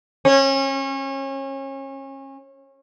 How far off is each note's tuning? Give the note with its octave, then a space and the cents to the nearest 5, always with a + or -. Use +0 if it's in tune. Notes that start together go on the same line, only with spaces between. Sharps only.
C#4 -30